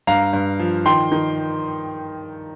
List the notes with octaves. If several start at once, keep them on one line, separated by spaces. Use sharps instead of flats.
G2 F5 A#5
G2
F3
D#3 G5 C6
D#3